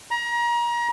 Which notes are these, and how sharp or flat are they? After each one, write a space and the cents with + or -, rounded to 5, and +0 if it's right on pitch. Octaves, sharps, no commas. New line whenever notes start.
A#5 +30